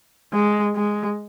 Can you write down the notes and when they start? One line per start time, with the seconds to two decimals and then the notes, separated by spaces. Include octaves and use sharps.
0.33 G#3
0.76 G#3